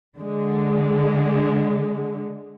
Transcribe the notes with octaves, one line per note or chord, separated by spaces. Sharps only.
D3 G#3